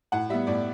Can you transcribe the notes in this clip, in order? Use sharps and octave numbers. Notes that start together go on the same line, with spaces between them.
A2 F#5
G3 B3 E5
A2 D5